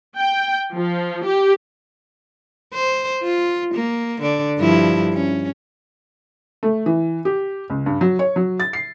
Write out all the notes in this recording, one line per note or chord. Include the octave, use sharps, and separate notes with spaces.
G5
F3
G4
C5
F4
A#3
D3 D5
G2 F3 E4
C#4
A3
E3
G4
C#2
G2
F#3
C#5
F#3
A6
C7